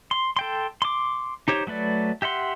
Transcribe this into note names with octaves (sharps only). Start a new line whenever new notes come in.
C6
A4 G5 C6
C6 D6
D#4 G4 C5 C#5
F#3 A3 B4 D5
G4 E5 F#5 C6